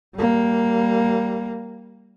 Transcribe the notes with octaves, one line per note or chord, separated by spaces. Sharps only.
G3 A#3